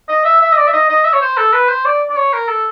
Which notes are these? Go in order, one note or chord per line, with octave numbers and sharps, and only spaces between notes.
D#5
E5
E5
D#5
D5
E5
D#5
D#5
E5
C#5
C5
A4
B4
C5
D5
D5
C#5
A#4
A4